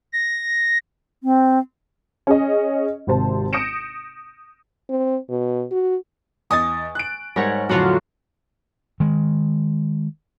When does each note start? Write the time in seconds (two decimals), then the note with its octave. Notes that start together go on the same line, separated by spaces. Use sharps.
0.13 A#6
1.23 C4
2.27 C#4 G#4 D#5
3.07 G#1 C3 C5 A5
3.53 D#6 G6 A#6 C#7 D7 E7
4.90 C4
5.29 B2
5.71 F#4
6.51 E2 D#5 G#5 C#6 D#6 A6
6.95 F#6 D7
7.36 G#2 G3 A#4 C#5 F#5
7.69 F2 A2 D3 F#3 F4 F#4
9.00 D#3 G#3